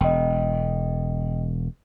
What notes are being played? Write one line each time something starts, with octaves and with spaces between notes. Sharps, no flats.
E1 D#5 G5